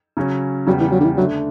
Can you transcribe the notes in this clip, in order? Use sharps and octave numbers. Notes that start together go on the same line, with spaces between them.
C#3 F#3 C#4
E2 C#3 F#3 G3
E3
F#3
D3
E3
D3 F#3 A3 D4